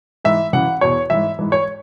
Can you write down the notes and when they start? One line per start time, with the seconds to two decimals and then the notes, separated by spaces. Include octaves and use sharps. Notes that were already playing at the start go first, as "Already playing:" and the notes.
0.25 G#2 E3 E5
0.53 F#2 C#3 E3 F#5
0.81 E2 B2 C#5
1.10 G#2 E3 E5
1.39 G#2 E3
1.52 C#5